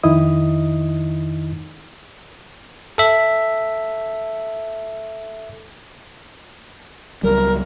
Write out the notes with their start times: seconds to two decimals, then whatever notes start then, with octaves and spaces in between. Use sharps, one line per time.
0.03 F2 D#3 D#4 E4 D#5 D#6
2.98 A4 E5
7.23 C#2 F#3 G3 A#4